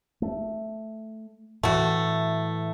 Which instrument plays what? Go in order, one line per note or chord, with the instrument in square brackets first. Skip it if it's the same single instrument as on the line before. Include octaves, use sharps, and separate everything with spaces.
[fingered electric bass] A3
[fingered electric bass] A2 E3 [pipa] A3 F#4